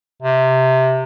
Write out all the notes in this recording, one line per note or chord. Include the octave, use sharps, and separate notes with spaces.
C3